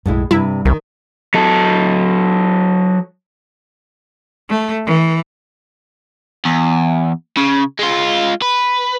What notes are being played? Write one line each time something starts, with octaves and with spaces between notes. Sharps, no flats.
B1 F#2 A2 G#3 E4
G2 C3 G3 E4
C2 D#3
F#3 A4
A3
E3
E2
C#3
G#3 F4
B4